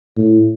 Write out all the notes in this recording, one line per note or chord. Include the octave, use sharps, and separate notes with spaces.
A2